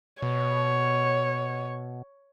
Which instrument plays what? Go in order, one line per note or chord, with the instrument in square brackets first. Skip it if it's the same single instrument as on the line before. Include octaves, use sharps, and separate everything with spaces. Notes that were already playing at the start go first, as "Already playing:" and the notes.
[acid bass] B2 [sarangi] C#5